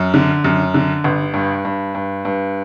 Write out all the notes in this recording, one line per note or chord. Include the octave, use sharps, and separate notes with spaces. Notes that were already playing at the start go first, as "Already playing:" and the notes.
Already playing: F#2
D3
F#2
D3
G1
G2
G2
G2
G2